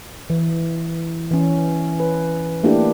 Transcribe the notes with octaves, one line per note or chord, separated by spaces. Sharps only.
E3
E3 C#4
B4
A3 A#3 D4 E4 G4